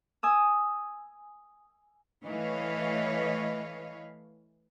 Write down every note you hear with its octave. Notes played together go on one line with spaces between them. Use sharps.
G#5 D#6 E6
E3 A3 B4 C#5 D#5 F5